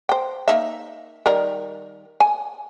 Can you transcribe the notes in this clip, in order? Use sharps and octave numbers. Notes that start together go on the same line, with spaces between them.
C5 G5
A#3 D#4 E5
D#3 G3 A#4
G#5